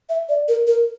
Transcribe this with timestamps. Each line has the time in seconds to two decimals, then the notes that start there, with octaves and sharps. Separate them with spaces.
0.09 E5
0.29 D5
0.48 A#4
0.67 A#4